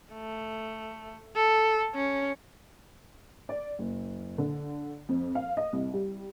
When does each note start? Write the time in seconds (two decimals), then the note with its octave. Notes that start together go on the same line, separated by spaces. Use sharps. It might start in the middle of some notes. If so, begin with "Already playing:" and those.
0.13 A3
1.36 A4
1.95 C#4
3.49 D5
3.79 F#1
4.38 D3
5.09 F2
5.35 F5
5.57 D#5
5.73 C2
5.93 G3